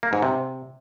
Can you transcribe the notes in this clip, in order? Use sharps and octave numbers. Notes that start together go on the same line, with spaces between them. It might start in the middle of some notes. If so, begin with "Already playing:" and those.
A#3
G#2
C3